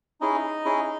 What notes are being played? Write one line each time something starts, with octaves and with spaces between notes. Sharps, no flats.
C#4 D#4 E4 G#4 D#5
C#4 E4 G#4